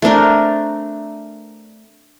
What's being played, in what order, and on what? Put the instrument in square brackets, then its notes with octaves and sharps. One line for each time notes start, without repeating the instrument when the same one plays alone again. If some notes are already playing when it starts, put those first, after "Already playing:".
[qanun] A3 C4 D4 A#4